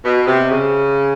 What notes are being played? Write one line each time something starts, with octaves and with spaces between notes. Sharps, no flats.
B2
C3
C#3